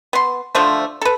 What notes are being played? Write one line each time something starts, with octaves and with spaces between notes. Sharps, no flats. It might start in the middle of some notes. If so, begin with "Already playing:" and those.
B3 C6
D3 F3 A3 C5
A4 B4